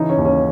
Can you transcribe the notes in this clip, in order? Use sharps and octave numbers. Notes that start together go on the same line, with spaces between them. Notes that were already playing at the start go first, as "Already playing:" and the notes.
Already playing: C#3 E3 D#4
C#4
D#2
C#4